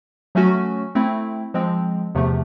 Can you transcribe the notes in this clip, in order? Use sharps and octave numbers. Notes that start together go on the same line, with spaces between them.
F#3 A3 C#4 F#4
A3 C4 E4
F3 G#3 C4
E2 C3 F3 A3